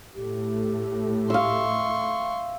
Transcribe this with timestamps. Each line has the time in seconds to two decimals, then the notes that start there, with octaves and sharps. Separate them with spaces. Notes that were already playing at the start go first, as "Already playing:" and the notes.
0.15 A2 A3 G4
1.30 E5 F5 C6 C#6